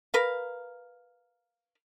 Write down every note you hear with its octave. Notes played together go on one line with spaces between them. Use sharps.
A#4 B4 F5